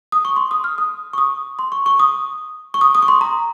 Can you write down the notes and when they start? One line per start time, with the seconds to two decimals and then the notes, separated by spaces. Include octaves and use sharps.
0.12 D#6
0.25 C#6
0.36 C6
0.51 D#6
0.64 F6
0.78 D#6
1.13 C#6
1.18 D#6
1.59 C6
1.72 C#6
1.86 C#6
2.00 D#6
2.74 C#6
2.81 D#6
2.95 D#6
3.02 C#6
3.08 C6
3.21 A#5